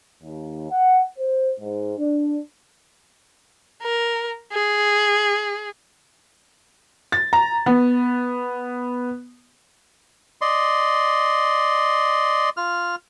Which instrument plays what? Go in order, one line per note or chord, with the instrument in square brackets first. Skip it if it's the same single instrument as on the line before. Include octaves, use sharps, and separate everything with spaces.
[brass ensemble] D#2
F#5
C5
G#2
D4
[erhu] A#4
G#4
[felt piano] A6
A#5
B3
[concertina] D5 D#5 C6
F4 F6